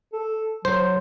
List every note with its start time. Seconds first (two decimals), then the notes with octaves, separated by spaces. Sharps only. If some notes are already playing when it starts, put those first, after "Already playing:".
0.13 A4
0.65 F#3 C5